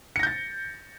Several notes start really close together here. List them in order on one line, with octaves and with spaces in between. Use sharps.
C#7 A#6 G6 A6